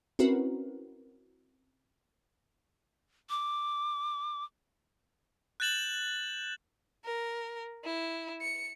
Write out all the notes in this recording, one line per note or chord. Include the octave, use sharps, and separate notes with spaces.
C4 C#4 E4 F#4 A#4 B4
D6
F#6 G6 A6 E7 F#7
A#4
E4
C#7